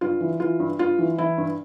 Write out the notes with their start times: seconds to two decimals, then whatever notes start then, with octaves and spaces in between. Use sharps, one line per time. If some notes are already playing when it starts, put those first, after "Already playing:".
0.01 G2 F4
0.20 E3
0.40 E3 F4
0.60 G2
0.79 G2 F4
0.99 E3
1.18 E3 E4
1.38 G2